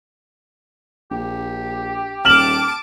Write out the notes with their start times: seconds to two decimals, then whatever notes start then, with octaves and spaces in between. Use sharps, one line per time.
1.11 A#1 G4
2.25 D#1 A5 D6 F6 E7 F#7